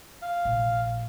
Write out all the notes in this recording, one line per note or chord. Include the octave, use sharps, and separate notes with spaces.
F5
A#1